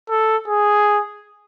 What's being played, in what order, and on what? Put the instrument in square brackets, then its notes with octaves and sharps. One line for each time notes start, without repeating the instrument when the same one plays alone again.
[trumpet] A4
G#4